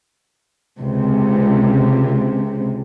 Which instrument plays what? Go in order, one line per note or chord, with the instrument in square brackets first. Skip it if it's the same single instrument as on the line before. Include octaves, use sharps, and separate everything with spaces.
[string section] C#2 C3